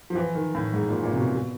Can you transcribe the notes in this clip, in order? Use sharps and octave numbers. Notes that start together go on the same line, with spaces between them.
F3
E3
D#3
A2
G#2
A#2
A#2
C3
B2
B2